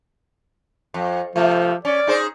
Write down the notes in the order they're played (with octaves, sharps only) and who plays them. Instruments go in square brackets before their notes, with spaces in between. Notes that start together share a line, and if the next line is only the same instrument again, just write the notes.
[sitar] F2
[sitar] C3 A3 [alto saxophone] F3
[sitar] C#4 [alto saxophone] D5
[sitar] D#4 G#4 C5